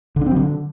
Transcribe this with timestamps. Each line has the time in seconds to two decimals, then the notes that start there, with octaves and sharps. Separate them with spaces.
0.16 D3
0.21 D4
0.26 C4
0.31 F#3
0.36 D3